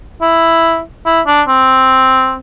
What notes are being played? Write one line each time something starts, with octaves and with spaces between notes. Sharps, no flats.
E4
E4
D4
C4